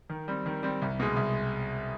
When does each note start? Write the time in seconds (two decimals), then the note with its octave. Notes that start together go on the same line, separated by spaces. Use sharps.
0.10 D#3
0.28 G3 C4
0.46 D#3
0.63 G3 C4
0.82 C2
1.00 B2 G#3
1.16 C2